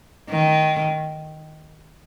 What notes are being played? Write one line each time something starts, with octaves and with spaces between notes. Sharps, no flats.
D#3